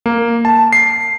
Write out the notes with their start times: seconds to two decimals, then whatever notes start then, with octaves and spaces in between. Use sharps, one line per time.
0.06 A#3
0.45 A5
0.73 C7